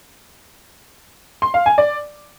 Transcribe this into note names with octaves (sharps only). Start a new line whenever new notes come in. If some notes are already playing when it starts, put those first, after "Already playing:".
C6
F5
G#5
D5